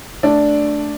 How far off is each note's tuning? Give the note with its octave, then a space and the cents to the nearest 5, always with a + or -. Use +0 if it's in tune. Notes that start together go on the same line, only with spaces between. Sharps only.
A3 +0 D4 +0